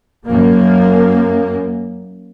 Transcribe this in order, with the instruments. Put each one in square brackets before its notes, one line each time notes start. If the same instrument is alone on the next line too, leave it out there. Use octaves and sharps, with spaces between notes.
[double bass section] F#2 A#3